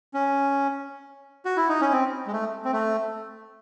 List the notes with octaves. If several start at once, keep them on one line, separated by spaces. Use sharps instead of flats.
C#4
F#4
E4
D#4
C#4
C4
G#3
A3
C4
A3